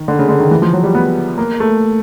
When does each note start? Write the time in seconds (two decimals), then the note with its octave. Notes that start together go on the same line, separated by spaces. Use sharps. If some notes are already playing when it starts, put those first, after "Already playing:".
Already playing: D#3
0.08 D3
0.19 C#3
0.29 D3
0.40 D#3
0.51 E3
0.62 F3
0.73 F#3
0.84 G3
0.95 B3
1.38 A#3
1.60 A3